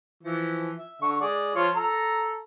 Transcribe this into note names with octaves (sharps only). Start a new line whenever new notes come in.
E3 F3
E5
D3 C#6
G#3 D5
F3 F4 C#5
A4 A#5